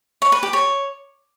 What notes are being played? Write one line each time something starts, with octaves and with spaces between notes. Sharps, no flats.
C#5
B4
G4
C#5